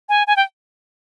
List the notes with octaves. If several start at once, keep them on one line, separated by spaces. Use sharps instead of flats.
G#5
G#5
G5